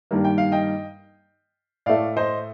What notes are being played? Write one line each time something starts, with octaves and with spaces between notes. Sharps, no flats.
G2 D#3 G3 A#3
G5
F5
D#5 G5
A2 A3 D5 F5
C5 D#5